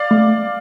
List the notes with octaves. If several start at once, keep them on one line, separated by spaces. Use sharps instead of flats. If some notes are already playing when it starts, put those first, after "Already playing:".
Already playing: D5 F5
A3